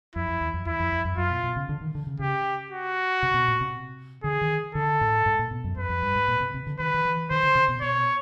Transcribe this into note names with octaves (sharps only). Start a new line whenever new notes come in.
F2 E4
F2
E2
F2
E2 E4
F2
F2
F#2
F#2 F4
B2
B2
C#3
D3
D#3
D3
C#3
C#3 G4
F#4
C3
B2
A#2
C3
D3 G#4
D#3
D3 A4
A2
G#2
A#2
B2
F#2
F#2 B4
F2
G2
G#2
A#2
C3
C3
D3
D#3 B4
D#3
E3
D#3 C5
D3
C3
B2
B2 C#5